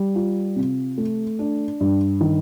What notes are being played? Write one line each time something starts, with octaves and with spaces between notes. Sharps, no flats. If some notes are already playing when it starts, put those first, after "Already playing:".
Already playing: G3
F4
C3
A3
D4
G2
D#3